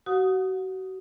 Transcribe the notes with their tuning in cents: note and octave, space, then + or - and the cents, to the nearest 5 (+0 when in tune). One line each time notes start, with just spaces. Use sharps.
F#4 +30 F#5 -35 D#6 +0